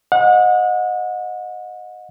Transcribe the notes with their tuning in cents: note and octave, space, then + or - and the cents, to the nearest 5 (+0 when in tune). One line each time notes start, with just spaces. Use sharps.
D#5 +0 F#5 -35